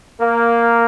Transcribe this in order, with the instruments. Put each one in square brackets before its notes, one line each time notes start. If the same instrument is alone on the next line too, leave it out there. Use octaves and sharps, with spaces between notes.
[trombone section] A#3